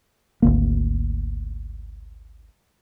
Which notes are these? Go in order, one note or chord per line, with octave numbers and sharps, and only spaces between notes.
G#1 D2 A#3